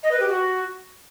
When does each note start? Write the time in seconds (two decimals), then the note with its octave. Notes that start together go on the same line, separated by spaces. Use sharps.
0.02 D#5
0.11 B4
0.19 G4
0.28 F#4